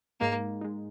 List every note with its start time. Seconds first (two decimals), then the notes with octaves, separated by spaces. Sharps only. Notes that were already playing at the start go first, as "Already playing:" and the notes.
0.20 G#2 G#3 A#3 D#4
0.61 G#3 D#4